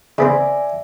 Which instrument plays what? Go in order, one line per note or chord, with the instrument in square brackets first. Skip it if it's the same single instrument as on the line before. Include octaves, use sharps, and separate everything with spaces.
[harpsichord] C#3 B3 C4 [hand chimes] D5 E5 G#5